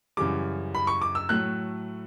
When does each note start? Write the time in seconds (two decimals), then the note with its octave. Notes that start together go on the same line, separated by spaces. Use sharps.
0.17 F#2 C#3 E3 G3 D6
0.75 B5
0.87 C#6
1.02 D6
1.15 E6
1.29 A2 F#3 A3 F#6